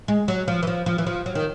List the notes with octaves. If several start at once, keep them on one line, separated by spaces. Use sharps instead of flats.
G#3
F#3
F3
E3
F3
F3
E3
F3
F#3
D#3